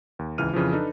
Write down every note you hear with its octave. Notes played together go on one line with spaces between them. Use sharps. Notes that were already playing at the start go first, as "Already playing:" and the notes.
D#2
G#1 C#2 E3 F6 D#7
F2 C#3 E3 F3
D4 D#4 A4 B4